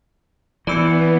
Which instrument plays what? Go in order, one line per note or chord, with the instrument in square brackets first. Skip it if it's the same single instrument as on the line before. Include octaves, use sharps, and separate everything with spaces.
[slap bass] E3 [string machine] B3 [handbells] D5 E6 C#7